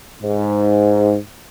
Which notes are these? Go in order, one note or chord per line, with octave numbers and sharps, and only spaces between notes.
G#2